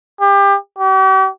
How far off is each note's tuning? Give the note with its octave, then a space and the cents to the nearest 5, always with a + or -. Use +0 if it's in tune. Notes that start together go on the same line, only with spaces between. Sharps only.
G4 +25
G4 -45